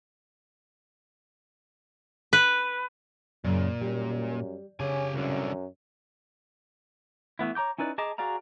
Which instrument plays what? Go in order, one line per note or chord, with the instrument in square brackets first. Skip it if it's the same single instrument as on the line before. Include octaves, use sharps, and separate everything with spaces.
[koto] B4
[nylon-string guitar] F#2 C#3 [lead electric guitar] A#2
[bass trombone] F#2 [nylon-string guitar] G3
[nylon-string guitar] C#3 [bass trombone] C#4 [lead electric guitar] G4 G#5
[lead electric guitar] C2 D3 [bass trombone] F#2
[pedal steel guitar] E3 A3 B3 E4
C#5 A#5 D6 G6
C#4 D#4 E4 B4 D5
G#4 D#5 A5 A#5 D6
F#4 G#4 D5 F5 A#5